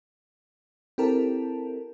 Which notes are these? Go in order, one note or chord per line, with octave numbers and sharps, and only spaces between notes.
C4 E4 G4 A4 A#4 A5